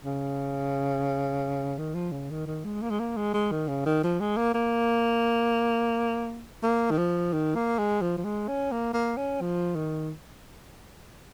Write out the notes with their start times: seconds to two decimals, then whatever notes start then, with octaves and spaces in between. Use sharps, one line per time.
0.05 C#3
1.78 D#3
1.94 F3
2.12 C#3
2.30 D#3
2.46 D#3
2.64 G#3
2.82 A#3
2.90 G#3
2.99 A#3
3.16 G#3
3.34 G#3
3.51 D#3
3.68 C#3
3.86 D#3
4.03 F3
4.20 G#3
4.37 A#3
4.54 A#3
6.63 A#3
6.91 D#3
6.98 F3
7.33 D#3
7.55 A#3
7.78 G#3
8.01 F3
8.17 F3
8.24 G#3
8.48 C#4
8.71 A#3
8.93 A#3
9.17 C#4
9.41 F3
9.75 D#3